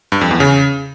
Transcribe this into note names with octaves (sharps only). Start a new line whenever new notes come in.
G2
F2
E2
C#3